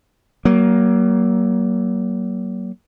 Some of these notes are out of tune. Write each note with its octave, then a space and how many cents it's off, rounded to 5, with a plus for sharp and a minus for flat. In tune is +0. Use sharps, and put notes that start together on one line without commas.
F#3 +35 A#3 +10